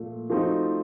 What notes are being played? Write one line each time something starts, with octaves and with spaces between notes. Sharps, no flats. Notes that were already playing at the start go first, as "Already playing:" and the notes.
Already playing: A#2 F3 A3
F3 A3 C4 D#4 F#4